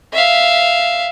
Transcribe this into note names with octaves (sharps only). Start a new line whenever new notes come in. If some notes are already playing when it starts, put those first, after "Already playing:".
E5 F5